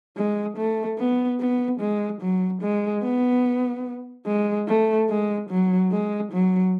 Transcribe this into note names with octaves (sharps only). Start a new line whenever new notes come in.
G#3
A3
B3
B3
G#3
F#3
G#3
B3
G#3
A3
G#3
F#3
G#3
F#3